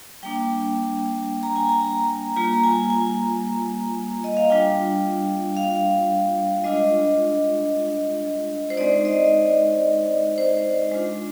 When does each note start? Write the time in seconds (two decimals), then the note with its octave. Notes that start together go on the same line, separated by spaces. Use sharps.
0.23 G3 A#3 D4 G5
1.43 A#5
1.56 G#5
1.69 A#5
2.36 G3 A#3 F4 A#5
2.54 A#5
2.64 G#5
2.90 G#5
4.24 D#5
4.37 F5
4.50 G3 D4 F4 G5
5.57 F5
6.64 G#3 D4 F4 D#5
8.70 C5
8.77 G#3 C4 D#4 D5
9.05 D#5
10.38 C5
10.92 G#3 D4 F4